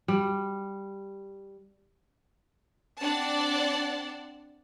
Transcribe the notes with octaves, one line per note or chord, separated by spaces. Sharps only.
G3
C4 D4 D5 F#5 A5